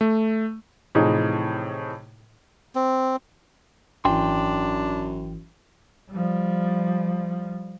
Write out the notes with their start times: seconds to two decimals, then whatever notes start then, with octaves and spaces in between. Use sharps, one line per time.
0.01 A3
0.95 A2 C3 E3 F3 D#4 G#4
2.75 C4
4.05 G#1 F#2 E3 D4 G5 C6
6.11 F3 G3